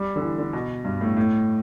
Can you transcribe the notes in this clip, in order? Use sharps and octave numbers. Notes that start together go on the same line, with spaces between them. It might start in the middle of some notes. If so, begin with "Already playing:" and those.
Already playing: G3
D3
E3
D3
B2
G2
A2
A2